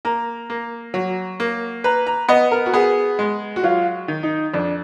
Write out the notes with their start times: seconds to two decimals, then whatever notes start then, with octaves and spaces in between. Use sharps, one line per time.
0.05 A#3 A#5
0.50 A#3
0.94 F#3
1.40 A#3
1.84 B4 A#5
2.07 A#5
2.29 B3 D#5
2.51 A#4
2.66 F#4
2.73 B3 G#4
3.19 G#3
3.56 F#4
3.63 F#3 F4
4.08 D#3
4.23 D#4
4.53 F2 D4